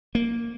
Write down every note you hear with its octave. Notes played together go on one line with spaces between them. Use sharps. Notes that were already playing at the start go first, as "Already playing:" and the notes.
A#3